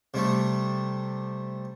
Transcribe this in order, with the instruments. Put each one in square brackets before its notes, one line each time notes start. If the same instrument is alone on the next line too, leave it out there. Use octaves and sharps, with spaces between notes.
[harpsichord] C3 G3 A3